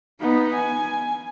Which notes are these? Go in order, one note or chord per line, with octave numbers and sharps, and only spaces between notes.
B3 D#4
G#5